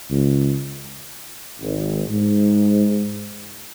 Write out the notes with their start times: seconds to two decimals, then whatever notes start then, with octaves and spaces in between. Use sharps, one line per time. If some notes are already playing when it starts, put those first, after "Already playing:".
0.11 C#2
1.60 G#1
2.08 G#2